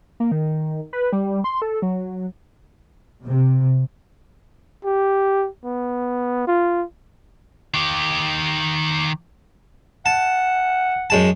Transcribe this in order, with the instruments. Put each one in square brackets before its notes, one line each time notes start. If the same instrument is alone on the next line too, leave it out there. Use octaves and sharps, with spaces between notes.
[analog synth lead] A#3
D#3
B4
G3
C6
A4
F#3
[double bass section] C3
[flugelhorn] G4
B3
F4
[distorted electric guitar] D#3 G4
[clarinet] F#5 [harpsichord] A5
[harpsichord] F#2 G#3 A5